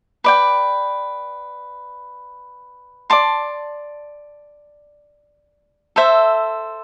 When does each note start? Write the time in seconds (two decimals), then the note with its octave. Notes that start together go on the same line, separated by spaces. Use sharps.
0.24 B4 D5 G5
3.10 D5 A5 C6
5.96 A4 C5 E5